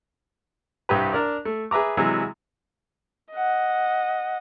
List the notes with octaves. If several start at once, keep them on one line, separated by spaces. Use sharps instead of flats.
C2 G2 G4 B4
D4 A#4 D5
A3
G#4 B4 E5 A#5 D6
C3 E3 F#3 G#3
D#5 F#5